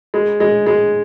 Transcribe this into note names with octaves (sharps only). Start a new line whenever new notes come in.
G#3
G#3
G#3